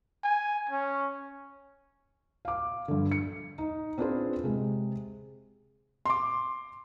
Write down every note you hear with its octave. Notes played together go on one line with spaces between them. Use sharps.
G#5
C#4
F5 D6
G2 D3
C#7
D#4
C4 D4 F4 G#4 B4 C5
C3 G#3
C6 D6